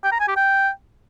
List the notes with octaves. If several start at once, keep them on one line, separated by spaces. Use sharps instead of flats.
G5
A#5
G#5
G4
G5